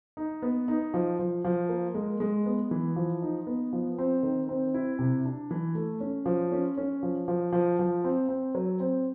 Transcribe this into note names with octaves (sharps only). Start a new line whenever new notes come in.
D#4
B3
D#4
F3
F3
F3
A#3
G#3
G#3
B3
E3
F3
D#4
B3
F3
C4
D#3
C4
E4
C3
D4
E3
A3
C#4
F3
C#4
C#4
F3
F3
F3
F3
C4
C4
F#3
C4